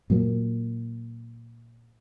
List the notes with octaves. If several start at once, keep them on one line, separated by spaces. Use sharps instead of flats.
A#2 F#3 A#3